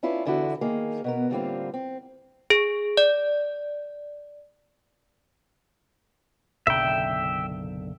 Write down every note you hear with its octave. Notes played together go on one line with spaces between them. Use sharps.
C#4 D4 E4 F4 B4
E2 D3 E4 F#4
D#3 A#3 G#4
B2 B3 A#4
A2 D3 G3 A#3 C4 F4
C4
G#4
D5
F#1 B1 D3 E5 G5